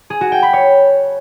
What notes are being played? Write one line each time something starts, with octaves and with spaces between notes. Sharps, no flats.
G#4
F#4
G5
B5
C#5